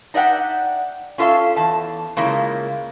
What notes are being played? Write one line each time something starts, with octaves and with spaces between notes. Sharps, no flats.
D#4 D5 E5 F#5 G5
C#4 F4 A4 E5 F5
E2 A5
C#3 G#3 A#3 E4 F4